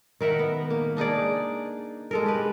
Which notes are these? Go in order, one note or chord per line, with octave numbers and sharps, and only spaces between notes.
D#3 A#4 E5 F#5
B3
A#3
D4 D#4 G#4 D5
G#3 A4 A#4
G4 B4